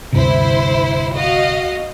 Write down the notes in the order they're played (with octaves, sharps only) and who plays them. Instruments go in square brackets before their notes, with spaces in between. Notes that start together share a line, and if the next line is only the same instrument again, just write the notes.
[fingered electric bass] D2 G2 C3 [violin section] E4 C5
[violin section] F#4 D#5 F5